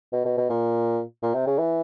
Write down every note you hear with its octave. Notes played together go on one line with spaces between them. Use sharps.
B2
B2
B2
A#2
A#2
C3
C#3
E3